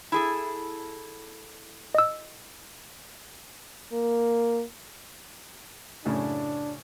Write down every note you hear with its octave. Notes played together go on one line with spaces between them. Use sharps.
E4 G#4 A4
D#5 E6
A#3
F#2 A2 C#3 D4